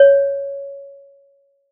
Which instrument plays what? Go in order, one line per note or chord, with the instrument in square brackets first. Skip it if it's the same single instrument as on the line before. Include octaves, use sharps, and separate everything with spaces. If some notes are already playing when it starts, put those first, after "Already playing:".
Already playing: [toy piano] C#5